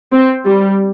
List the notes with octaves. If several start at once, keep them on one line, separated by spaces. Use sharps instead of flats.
C4
G3